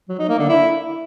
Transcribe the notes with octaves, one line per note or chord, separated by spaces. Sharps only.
F#3
D#4
A#3
D3
E4